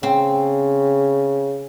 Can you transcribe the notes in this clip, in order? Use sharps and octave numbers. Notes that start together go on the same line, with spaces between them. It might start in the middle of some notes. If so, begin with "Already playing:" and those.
C#3 C4